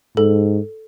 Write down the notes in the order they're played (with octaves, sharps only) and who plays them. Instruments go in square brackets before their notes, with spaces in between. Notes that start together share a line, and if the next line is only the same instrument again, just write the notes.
[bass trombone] G#2 [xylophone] A4